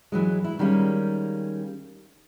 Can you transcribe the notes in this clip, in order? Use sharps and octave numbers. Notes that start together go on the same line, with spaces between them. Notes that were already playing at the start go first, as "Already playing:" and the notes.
F#2 E3 F#3 G#3
E4
D#3 G3 G#3 A#3 C#4